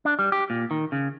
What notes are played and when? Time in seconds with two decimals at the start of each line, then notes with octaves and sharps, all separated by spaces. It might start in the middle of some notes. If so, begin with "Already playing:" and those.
0.05 D4
0.19 G3
0.32 G4
0.50 A#2
0.71 D#3
0.92 C#3